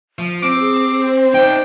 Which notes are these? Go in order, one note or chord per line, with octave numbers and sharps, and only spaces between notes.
F3
C4 C5 D6
G#4
C5
D#4 D5 G5